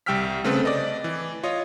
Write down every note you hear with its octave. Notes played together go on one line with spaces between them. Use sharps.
C2 G3 G5 E6 F6 B6
C#3 A3 C4 A4 B4
D5 D#5
E3
F4 C#5 D#5 D#6